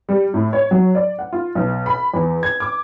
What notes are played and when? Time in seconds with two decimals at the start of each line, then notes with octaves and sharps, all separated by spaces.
0.09 G3
0.34 A2
0.53 C#5
0.71 F#3
0.95 D5
1.19 F#5
1.33 F4
1.55 B1
1.86 B5
2.14 E2
2.43 G#6
2.60 D6